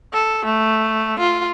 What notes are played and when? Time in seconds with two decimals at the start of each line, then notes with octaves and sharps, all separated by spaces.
0.13 A4
0.45 A3
1.19 F4